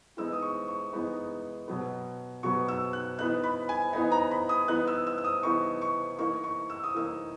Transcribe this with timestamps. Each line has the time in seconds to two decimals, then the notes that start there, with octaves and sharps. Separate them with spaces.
0.17 E3 G#3 B3 D#4 E6
0.33 D#6
0.42 C#6
0.68 C#6
0.93 E3 G#3 B3 D#4
1.68 B2 F#3 B3
2.43 B2 F#3 B3 C#6
2.68 E6
2.93 F#6
3.18 E3 B3 D#4 F#6
3.43 B5
3.69 G#5
3.93 E3 B3 D#4 G#5
4.12 A#5
4.31 B5
4.49 D#6
4.68 E3 B3 D#4 F#6
4.87 E6
5.07 E6
5.18 E6
5.24 D#6
5.43 E3 B3 D#4 C#6
5.82 C#6
6.19 E3 A#3 D#4 C#6
6.44 C#6
6.70 E6
6.83 D#6
6.94 E3 A#3 D#4 E6